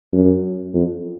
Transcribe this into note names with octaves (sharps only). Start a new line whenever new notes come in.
F#2
F2